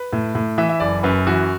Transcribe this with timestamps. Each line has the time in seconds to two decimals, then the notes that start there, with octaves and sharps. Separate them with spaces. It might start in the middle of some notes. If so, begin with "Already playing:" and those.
Already playing: B4
0.13 A2
0.35 A2
0.58 E3 E5
0.69 E5
0.80 F#1 D5
1.03 F#2 B4
1.27 E3 F#4